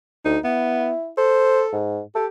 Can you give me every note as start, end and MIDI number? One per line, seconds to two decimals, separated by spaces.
0.25 0.37 38
0.25 0.39 63
0.44 0.92 59
0.44 1.10 64
1.18 1.78 69
1.18 1.63 72
1.72 2.00 44
2.15 2.29 67
2.15 2.26 69